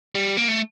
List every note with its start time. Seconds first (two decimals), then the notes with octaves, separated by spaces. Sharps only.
0.15 G3
0.37 A#3
0.48 A3